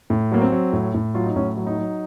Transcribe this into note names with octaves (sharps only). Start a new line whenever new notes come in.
A2
F#3 A#3
C4
F#3
A2
A2
F#3 F4
D#4
A2 C#4
F#3
D#4
F#3